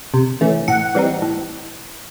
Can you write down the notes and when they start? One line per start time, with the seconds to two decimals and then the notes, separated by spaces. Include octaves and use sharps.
0.14 C3
0.41 E3 A3 C#4
0.68 A2 F#5
0.95 E3 G3 C4 D#4
1.22 A2